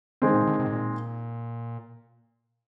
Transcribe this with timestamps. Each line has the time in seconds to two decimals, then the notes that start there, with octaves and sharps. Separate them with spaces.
0.22 D3 D#3 G#3 C4
0.34 A#2
0.47 D3
0.60 C3
0.67 G#2
0.72 A#2